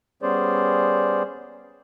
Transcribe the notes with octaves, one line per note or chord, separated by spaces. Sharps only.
G3 B3 C#4 G#4 C5 D5